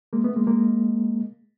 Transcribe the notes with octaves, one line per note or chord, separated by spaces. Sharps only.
G#3 A#3
A3 B3
G#3 A#3
G#3 A#3